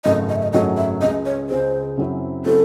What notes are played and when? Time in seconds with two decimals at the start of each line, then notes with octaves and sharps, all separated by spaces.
0.04 G#1 F#2 C#3 F#3 A3 D#5
0.29 D#5
0.36 E5
0.43 D#5
0.53 G#1 F#2 C#3 F#3 A3 D#5
0.77 E5
1.01 C#2 C#3 G#3 D#5
1.25 C#5
1.50 C#2 C#3 G#3 C5
1.97 F#2 C#3 F#3 C4 E4
2.46 C#3 F#3 C4 E4 A4